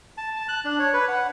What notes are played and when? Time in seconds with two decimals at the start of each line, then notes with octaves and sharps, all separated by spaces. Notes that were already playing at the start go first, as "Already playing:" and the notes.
0.18 A5
0.36 A5
0.48 F#6
0.65 D4
0.79 C#5
0.94 B4
1.08 F#5